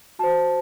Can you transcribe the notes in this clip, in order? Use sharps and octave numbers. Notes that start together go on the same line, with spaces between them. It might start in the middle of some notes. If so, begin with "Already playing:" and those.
F#4 C5 A5